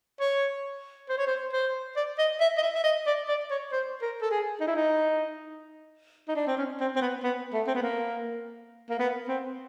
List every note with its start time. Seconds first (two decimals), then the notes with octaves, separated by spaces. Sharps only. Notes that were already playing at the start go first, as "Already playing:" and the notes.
0.21 C#5
1.09 C5
1.18 C#5
1.27 C5
1.53 C5
1.97 D5
2.19 D#5
2.41 E5
2.58 D#5
2.62 E5
2.75 E5
2.84 D#5
3.07 D5
3.28 D5
3.51 C#5
3.72 C5
4.02 A#4
4.22 A4
4.31 G#4
4.61 D#4
4.68 E4
4.76 D#4
6.28 D#4
6.36 D4
6.47 C4
6.58 C#4
6.80 C4
6.96 C4
7.01 B3
7.23 B3
7.53 A3
7.67 C4
7.75 B3
7.82 A#3
8.90 A#3
8.99 B3
9.29 C4